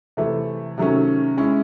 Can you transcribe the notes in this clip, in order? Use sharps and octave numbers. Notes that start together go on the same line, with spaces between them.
C3 E3 A3
C3 D#3 F#3 A3 C#4
G#3 C#4 E4